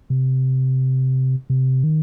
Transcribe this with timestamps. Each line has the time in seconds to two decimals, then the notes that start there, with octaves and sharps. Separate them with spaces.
0.10 C3
1.50 C3
1.84 D#3